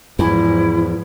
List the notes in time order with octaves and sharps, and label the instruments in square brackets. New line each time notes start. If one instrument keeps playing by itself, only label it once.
[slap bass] E2 [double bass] G#2 F3 [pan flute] E4